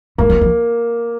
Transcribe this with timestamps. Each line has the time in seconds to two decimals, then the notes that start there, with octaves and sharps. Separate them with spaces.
0.18 A3 A#3
0.30 F#3
0.41 F3